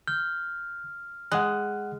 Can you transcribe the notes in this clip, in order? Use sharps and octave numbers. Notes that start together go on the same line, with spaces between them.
F6 G6
G#3 F#5 F#6